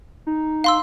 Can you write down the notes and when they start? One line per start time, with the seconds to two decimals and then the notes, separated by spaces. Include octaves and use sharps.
0.27 D#4
0.64 F5 C6 E6